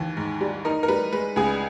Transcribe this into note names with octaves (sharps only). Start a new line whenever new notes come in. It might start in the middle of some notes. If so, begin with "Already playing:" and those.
Already playing: D#2 E3
G#2
G3
D#4 A#4
A#4
G3 B4
G#3 B4
C#2 G#4